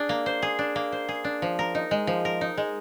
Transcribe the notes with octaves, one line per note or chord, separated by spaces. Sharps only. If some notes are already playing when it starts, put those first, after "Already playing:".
Already playing: D4 G#4
A#3
C5
G#4
D4
A#3
C5
G#4
D4
F3
A#4
D#4
G#3
F3
A#4
D#4
G#3